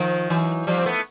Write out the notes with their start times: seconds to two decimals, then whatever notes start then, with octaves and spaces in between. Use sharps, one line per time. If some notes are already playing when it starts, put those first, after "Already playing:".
Already playing: D#3 F3
0.30 E3 F#3
0.67 F3 G3
0.78 C4
0.86 A3 B3